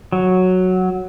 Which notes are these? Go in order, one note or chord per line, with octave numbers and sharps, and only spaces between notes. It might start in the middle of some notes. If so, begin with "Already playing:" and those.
F#3